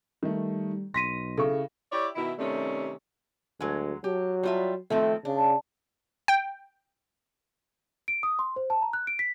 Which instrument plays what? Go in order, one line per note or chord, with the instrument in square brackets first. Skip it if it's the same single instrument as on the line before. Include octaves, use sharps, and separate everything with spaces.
[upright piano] D#3 A3 [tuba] G3
[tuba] B1 [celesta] C6 B6 D#7 [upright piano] A#6
[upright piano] C#3 E4 C#6 [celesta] A4
[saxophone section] E4 G4 C#5 D5 E5
B2 D#3 E4
C3 D#3 G3 A3 C#4
[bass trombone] D2 [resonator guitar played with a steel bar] F#3 G#3
[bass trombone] F#3 [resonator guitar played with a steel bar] G4
[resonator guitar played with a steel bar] G3 F4 E5
[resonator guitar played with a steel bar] D#3 F3 C4 [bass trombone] A3
[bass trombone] C#3 [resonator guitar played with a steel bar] D4
[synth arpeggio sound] G5
[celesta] D7
D#6
C6
C5
A5
A#5
F#6
D7
B6